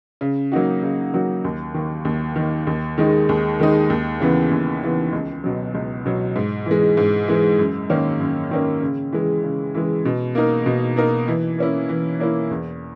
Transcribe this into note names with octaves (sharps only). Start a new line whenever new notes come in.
C#3
F#3 A#3 D#4 F#4
C#3
F#3 A#3 D#4 F#4
D#2
D#3 A#3
D#2
D#3 A#3
D#2
D#3 G#3 D#4
D#2
D#3 G#3 D#4
D#2
C#3 E3 B3
D#2
C#3 E3 B3
C#2
B2 F#3
C#2
B2 F#3
G#2
E3 G#3
G#2
E3 G#3
F#2
D#3 A#3 C#4
F#2
D#3 A#3 C#4
C#3
E3 G#3
C#3
E3 G#3
B2
A#3 D#4 A#4
B2
A#3 D#4 A#4
E3
A#3 C#4 E4
E3
A#3 C#4 E4
E2